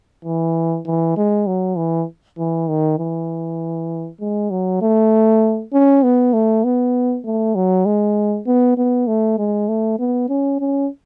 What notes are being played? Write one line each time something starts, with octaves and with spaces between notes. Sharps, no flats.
E3
E3
G#3
F#3
E3
E3
D#3
E3
G#3
F#3
A3
C#4
B3
A3
B3
A3
F#3
G#3
B3
B3
A3
G#3
A3
B3
C#4
C#4